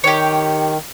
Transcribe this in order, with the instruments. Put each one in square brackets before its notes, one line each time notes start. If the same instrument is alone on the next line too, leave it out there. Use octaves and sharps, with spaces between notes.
[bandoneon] D#3 [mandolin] G4 C#5